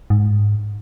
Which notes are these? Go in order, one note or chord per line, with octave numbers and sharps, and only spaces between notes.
G#2